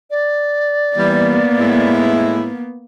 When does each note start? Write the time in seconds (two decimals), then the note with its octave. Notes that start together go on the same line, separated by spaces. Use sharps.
0.11 D5
0.97 E3 G3 A#3 B3
1.58 A2 G#3 E4